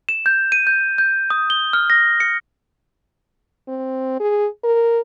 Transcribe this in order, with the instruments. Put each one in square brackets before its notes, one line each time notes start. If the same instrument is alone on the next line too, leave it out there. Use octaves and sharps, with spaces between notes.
[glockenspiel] E7
G6
D#7
G6
G6
D#6
G7
F6
A#6
C#7
[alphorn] C4
G#4
A#4